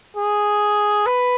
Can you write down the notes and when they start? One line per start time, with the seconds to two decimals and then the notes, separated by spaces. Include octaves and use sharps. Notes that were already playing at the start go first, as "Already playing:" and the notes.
0.17 G#4
1.06 B4